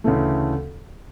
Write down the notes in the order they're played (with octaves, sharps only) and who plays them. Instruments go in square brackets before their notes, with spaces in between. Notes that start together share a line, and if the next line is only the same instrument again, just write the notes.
[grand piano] D2 C#3 E3 A3